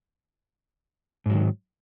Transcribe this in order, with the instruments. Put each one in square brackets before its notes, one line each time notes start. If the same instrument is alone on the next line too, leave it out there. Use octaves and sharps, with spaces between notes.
[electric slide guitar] G#2
F#3
D#3